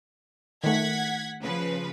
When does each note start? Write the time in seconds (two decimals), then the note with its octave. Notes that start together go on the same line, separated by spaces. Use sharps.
0.64 D#3 A3 F#5 G#6 B6
1.41 C#3 F3 B4